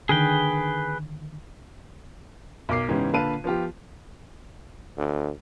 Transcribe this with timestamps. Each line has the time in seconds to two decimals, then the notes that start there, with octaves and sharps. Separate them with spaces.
0.09 D3 D#3 G#4 B4 G5
2.69 B1 A#4 D6 C7
2.88 G#2 C#3 E3 B3 C#4 G4
3.13 A#2 D3 B4 F5 A5 D#7
3.44 F3 B3 F4 G4
4.97 D2